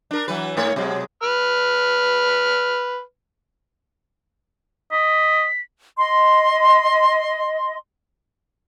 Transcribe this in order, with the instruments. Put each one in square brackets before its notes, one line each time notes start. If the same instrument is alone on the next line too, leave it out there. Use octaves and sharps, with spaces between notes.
[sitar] D4 A#4
E3 F#3 B4
G#2 A3 C#5
B2 F#3 G#3
[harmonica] B4 F6
[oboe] D#5 [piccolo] B6
[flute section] D#5 C6